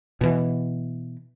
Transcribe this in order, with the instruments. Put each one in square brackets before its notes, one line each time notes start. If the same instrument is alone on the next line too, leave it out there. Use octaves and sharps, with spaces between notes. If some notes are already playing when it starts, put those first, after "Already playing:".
[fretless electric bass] B2 E3